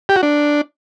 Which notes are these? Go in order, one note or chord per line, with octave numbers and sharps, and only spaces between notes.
G4
F#4
D4